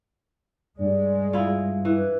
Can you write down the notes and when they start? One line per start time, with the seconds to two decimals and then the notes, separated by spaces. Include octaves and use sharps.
0.79 G2 G#3 D5
1.33 E4 F4
1.85 E3 B4